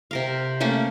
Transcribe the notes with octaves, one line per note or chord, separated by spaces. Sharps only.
C3 A#4 F5
A3 A#3 C#4